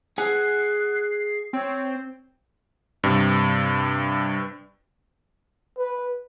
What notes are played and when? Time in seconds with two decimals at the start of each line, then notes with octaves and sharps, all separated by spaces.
0.18 G#4 F#5 G#5 F#6 C7
1.53 C4 C#5
3.04 G2 C3
5.78 B4